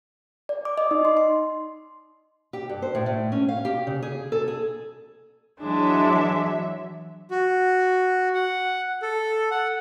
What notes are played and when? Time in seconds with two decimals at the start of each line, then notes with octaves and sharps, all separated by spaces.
0.49 D5
0.65 D6
0.78 D#5
0.91 D#4
1.05 C6
1.17 C6
2.53 G4
2.69 G2
2.82 C5
2.95 A2
3.06 A2
3.32 C#4
3.49 F5
3.65 G4
3.87 C#3
4.02 G#4
4.32 A4
4.48 G#4
5.60 E3 F#3 G#3 D4 E5
7.31 F#4
8.34 F#5
9.02 A4
9.51 F#5